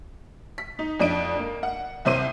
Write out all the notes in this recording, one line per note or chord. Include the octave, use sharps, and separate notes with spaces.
B6
D#4
F2 D4 D#5 D7
A#3
F#5
C2 C3 C5 D#7